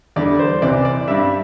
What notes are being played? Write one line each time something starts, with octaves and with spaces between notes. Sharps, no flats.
E2 D3 G3 D5
C5
C2 C3 E3 D5
D5
G2 G3 E5